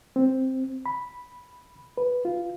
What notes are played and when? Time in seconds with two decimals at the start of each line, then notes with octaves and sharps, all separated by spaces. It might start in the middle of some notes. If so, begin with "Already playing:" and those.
0.16 C4
0.86 B5
1.98 B4
2.25 F4